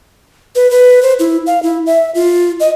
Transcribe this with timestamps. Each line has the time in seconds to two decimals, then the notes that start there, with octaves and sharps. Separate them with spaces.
0.55 B4
0.71 B4
1.02 C5
1.19 E4
1.46 F5
1.63 E4
1.86 E5
2.15 F4
2.60 D#5